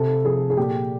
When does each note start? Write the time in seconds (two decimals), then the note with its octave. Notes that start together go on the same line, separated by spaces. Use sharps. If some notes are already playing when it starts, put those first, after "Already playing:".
Already playing: C3 A4
0.25 F3 G#4
0.50 G#4
0.57 A#2 G4